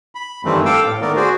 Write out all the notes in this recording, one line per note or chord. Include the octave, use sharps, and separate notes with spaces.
B5
G2 D#3 E3 G3 A3 C4
A4 F5 G5 D6 E6
A2
D#3 A3 B3 A#4 D5
F#4 G#4 C5 D5